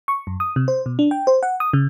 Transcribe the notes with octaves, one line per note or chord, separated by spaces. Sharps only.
C#6
F#2
D#6
C3
C5
B2
D4
G5
C5
F#5
D#6
C#3